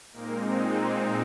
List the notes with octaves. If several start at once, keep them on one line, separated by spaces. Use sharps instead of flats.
A#2 G#3 A#3 C4 D#4 A#4
G#3 G#4